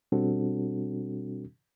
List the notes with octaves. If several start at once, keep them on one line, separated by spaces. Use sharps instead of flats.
B2 G3 C4 D4 F#4 A4